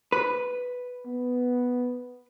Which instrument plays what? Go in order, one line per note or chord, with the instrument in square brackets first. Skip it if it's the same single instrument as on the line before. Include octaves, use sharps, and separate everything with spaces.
[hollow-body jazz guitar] B4
[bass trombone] B3